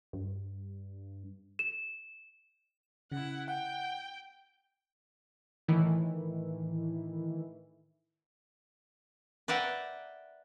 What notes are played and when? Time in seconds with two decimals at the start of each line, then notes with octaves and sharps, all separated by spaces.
0.13 G2
1.59 E7
3.12 C#3 E4 F#5
3.48 F#5 G5
5.68 A2 D#3 E3 E4
9.48 B4 D5 E5 F#5 G5 A#5